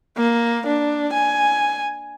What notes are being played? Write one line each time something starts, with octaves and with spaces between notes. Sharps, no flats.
A#3
D4
G#5